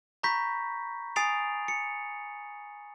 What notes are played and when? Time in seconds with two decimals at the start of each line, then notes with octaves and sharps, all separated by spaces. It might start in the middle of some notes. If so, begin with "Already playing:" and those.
0.23 A#5 B5 C#6 G6 A#6 B6
1.16 G#5 D#6 A6 C7 D7 F7
1.68 C#7